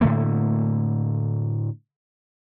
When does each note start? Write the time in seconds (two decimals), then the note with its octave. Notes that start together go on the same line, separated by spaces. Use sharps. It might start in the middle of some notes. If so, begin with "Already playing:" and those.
0.01 A2 D3 A3 A#3